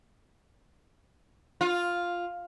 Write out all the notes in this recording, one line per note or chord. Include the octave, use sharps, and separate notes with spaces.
F4